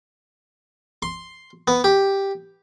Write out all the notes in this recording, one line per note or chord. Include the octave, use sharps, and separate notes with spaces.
C6
B3
G4